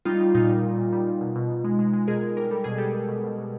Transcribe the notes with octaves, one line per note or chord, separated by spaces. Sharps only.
G3 D#4 F4
G3
A#2 D#4 F4
G3
A#2
A#2
G3
A#2
B2
B2
B2
G#3
G#3
G#3
B2 G#4 A#4
G#3
G3 A#4
G3 A4
B2 G#4
G3 G4 A4
G3
B2
B2
B2